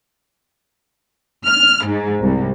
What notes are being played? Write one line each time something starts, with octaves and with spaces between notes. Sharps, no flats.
F6
G#2
C2